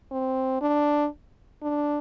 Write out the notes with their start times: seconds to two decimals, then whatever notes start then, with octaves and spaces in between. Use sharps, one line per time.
0.11 C4
0.61 D4
1.62 D4